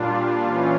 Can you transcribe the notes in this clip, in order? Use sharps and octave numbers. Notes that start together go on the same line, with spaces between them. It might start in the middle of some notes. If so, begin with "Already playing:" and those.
Already playing: A#2 G3 D4 F4
E3 G3 C#4 F4